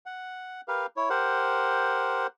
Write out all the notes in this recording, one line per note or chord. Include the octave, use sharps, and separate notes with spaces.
F#5
G4 A#4 B4 F5
E4 C#5
G4 A#4 C5 F#5